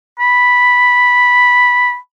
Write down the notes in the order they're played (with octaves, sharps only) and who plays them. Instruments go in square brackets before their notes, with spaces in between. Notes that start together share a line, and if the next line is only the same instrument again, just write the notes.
[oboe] B5